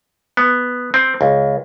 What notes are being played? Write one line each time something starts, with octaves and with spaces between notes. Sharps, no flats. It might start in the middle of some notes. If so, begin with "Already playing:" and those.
B3
C4
C#2